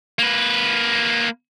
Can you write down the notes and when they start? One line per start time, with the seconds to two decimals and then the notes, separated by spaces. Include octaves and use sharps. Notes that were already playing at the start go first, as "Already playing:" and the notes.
0.19 A#3 B4